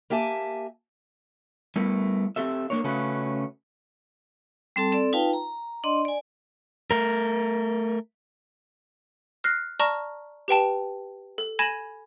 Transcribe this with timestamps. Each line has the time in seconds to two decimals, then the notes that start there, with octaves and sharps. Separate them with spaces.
0.10 A#3 G4 E5 G#5 A5
1.76 G3 A3 B3 E4 A#4
2.36 C4 C#4 G4 A4 E5
2.70 A#3 D4 A#4 C#5
2.84 C#3 A3 C#4 F#4 B4
4.76 G3 C4 A4 A5
4.92 C4 A4 D5
5.13 D#4 F4 B4 F5 G5 A5
5.33 A#5
5.84 D4 D5 D#5 C6
6.05 D5 G#5
6.91 A3 A#4
9.44 F6 F#6 A#6 C7
9.80 D5 A5 A#5 C#6 F6 A#6
10.48 G4 B4 G5 A5
11.38 A4
11.59 G#5 B5 G#6 A#6 E7 F#7